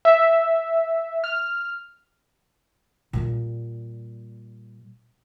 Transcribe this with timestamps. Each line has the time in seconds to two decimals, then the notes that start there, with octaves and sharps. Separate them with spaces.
0.05 E5
1.24 F6
3.13 A#2 G3